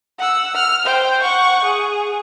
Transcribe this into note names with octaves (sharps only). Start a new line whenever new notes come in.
F#5 E6
F6
C5 G5
F#5 C#6
G#4